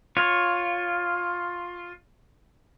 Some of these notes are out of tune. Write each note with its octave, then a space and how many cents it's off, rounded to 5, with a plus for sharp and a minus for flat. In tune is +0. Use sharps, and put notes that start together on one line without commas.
F4 +10 C#5 +0